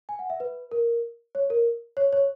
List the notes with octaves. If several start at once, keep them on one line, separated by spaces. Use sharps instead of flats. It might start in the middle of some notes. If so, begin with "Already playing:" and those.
G#5
F#5
E5
B4
A#4
C#5
A#4
C#5
C#5